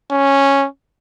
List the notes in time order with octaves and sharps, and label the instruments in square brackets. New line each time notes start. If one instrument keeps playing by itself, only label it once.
[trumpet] C#4